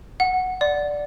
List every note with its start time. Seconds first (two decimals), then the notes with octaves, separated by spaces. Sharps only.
0.20 F#5
0.61 D5